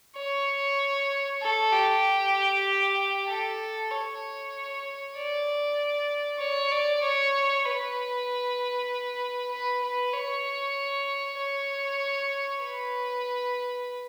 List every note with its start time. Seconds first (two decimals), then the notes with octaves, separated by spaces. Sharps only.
0.17 C#5
1.42 A4
1.73 G4
3.28 A4
3.91 C#5
5.15 D5
6.39 C#5
6.71 D5
7.02 C#5
7.65 B4
9.51 B4
9.83 B4
10.13 C#5
11.38 C#5
12.62 B4